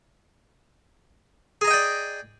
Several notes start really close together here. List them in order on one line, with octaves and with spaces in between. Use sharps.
G#4 A#5 D#5 G5 D5